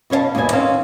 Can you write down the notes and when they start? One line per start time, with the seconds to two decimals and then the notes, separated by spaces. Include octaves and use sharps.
0.10 B2 C#4 C#5 F5 A5
0.35 D#2 B2 G3 G#4 G#5
0.52 D#3 C4 C#4 C5 F5